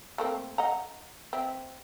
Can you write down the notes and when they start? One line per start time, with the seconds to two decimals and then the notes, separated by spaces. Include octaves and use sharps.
0.18 A3 A#3 C4
0.58 D#5 F#5 A#5
1.33 C4 E5